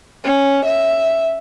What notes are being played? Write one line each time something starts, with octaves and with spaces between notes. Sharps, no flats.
C#4
E5